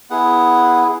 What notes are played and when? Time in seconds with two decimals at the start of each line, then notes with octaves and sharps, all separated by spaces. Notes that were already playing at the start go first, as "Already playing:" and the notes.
0.10 B3 E4 G#4 F#5